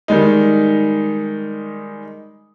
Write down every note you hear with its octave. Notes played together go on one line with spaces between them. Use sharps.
D#3 G3 G#3 D#4